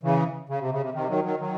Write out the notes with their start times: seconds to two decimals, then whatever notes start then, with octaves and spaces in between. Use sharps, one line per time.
0.03 C#3 E3
0.49 C#3
0.60 C3
0.72 C#3
0.83 C3
0.94 C3 D#3
1.09 D#3 F#3
1.24 D#3 F#3
1.39 D#3 F#3